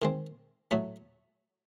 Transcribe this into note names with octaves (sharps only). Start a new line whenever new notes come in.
D#3 G#3 C4
A2 F#3 A3